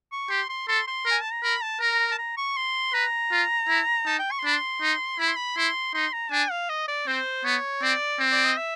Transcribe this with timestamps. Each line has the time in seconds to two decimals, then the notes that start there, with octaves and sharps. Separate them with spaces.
0.12 C#6
0.30 G4 C6
0.49 C6
0.68 A4 C6
0.87 C6
1.06 A#4 G#5
1.22 A5
1.32 A#5
1.43 A#4 B5
1.62 A5
1.81 A#4 A#5
2.00 A#5
2.12 A5
2.18 A#5
2.37 C#6
2.57 C6
2.93 B4 A#5
3.31 F4
3.69 E4
4.06 D#4 A5
4.19 G5
4.31 C#6
4.39 C6
4.44 D4 B5
4.53 C6
4.82 D#4
5.19 E4 B5
5.28 C6
5.36 B5
5.57 E4 C6
5.94 D#4 C6
6.13 A#5
6.31 D4 G#5
6.51 F5
6.70 D#5
6.88 D5
7.07 C4 C5
7.44 B3 C#5
7.82 C4 D5
8.20 C4
8.32 D5
8.45 D#5
8.57 E5